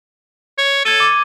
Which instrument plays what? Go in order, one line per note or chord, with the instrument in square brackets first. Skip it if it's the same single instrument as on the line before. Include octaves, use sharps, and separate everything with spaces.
[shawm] C#5
[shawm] A4 [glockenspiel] G#6 D#7
[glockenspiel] D6